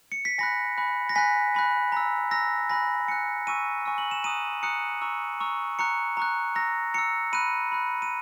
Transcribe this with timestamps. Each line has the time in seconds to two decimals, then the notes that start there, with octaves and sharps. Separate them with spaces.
0.12 C#7
0.25 B6
0.38 G#5 B5 F#6 A#6
0.78 G#5 B5 F#6
1.09 A#6
1.15 G#5 B5 F#6 B6
1.55 G#5 B5 F#6
1.92 A#5 E6
2.31 A#5 E6 A#6
2.70 G#5 B5 F#6 A#6
3.08 G#5 B5 F#6 C#7
3.47 G#5 C#6 E6 D#7
3.86 G#5 C#6 E6
3.98 F#7
4.11 E7
4.24 A#5 D#6 F#6 D#7
4.63 A#5 D#6 F#6 C#7
5.02 A#5 C#6 E6
5.40 A#5 C#6 E6
5.79 A#5 C#6 F#6 C#7
6.17 A#5 C#6 F#6
6.55 A#5 E6 A#6
6.94 A#5 E6 C#7
7.33 B5 F#6 D#7
7.72 B5 F#6
8.02 D#7